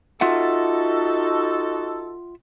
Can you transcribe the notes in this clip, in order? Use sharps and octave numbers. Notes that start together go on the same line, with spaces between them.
D#4 F4 F#4 A4 E5 F#5